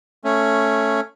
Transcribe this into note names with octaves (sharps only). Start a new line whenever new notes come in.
A3 C#4